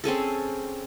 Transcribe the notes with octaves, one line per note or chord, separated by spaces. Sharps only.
C4 C#4 G#4 A4